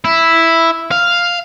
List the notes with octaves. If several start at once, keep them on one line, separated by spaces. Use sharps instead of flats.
E4
F5